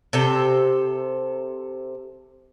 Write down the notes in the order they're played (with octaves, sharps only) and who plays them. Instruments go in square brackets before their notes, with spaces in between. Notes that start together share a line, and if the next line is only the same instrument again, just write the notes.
[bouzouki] C3 A4 G5